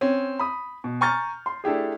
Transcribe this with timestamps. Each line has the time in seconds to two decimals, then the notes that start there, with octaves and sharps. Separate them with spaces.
0.01 C4 C#4
0.39 B5 D#6
0.84 B2
1.01 G#5 A#5 C#6 F6 G6 A6
1.46 C6
1.64 A3 D4 E4 G4 G#4